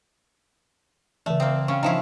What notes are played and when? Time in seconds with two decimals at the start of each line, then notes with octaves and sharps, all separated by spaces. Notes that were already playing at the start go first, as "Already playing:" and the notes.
1.26 C#3 E3 A3
1.40 A#3 C4 D#6
1.68 C#3 C#4 G5 C#6
1.83 D#3 F3 E4 A#5